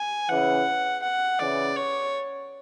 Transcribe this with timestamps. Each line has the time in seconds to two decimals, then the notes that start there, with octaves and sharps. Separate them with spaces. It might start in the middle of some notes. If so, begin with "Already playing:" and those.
Already playing: G#5
0.29 C#3 E3 F#5
1.02 F#5
1.39 C#3 E3 D5
1.76 C#5